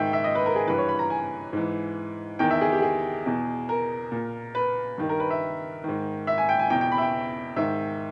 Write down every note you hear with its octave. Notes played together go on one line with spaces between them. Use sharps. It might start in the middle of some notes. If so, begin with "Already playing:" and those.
Already playing: G#2 D#3 E5 G5
E5
D#5
B4
A#4
G#4
G2 E3 B4
C#5
B5
A#5
G#5
G#2 E3
E2 D#3 G5
E5
G#4
G4
G#4
E2 B2
A#4
A#2
B4
G2 D#3
A#4
B4
E5
G#2 D#3
E5
G#5
G5
G#5
E2 B2 G5
G5
B5
E5
G5
G#2 D#3 E5